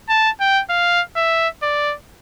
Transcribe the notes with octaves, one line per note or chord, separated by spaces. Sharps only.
A5
G5
F5
E5
D5